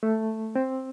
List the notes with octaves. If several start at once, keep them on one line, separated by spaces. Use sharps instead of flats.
A3
C4